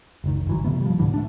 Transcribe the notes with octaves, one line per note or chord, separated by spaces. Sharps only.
F#1 C#2 D#3
G1 E3 F#3
C3 D#3 A3 B3
F3 G3
D2 A2 D3 E3
A3 D4